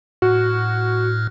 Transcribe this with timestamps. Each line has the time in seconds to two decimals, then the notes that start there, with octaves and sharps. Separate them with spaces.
0.22 A2 F#4 F6 F#6